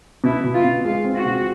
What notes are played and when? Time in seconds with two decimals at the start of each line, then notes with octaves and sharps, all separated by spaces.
0.24 B2 E4
0.44 B2
0.54 F4
0.64 B2
0.85 G#3 F4
1.05 C4
1.15 F#4
1.25 B2